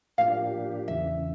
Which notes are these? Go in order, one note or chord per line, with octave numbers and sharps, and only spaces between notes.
A2 F3 A#3 D4 G4 F5
E2 C#3 E3 E5